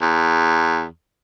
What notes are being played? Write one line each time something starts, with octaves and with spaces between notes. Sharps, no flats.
E2